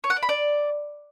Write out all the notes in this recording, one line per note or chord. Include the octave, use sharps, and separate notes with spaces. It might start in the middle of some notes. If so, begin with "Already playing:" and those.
C#5
F#5
D5
B5
D5